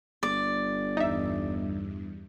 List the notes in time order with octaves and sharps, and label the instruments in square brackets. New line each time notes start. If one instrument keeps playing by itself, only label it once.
[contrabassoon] G1 [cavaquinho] D5
[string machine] E2 G2 [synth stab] D#4 E5